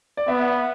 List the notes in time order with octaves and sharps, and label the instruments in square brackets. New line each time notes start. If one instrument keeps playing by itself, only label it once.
[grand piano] D5
[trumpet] B3 [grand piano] E5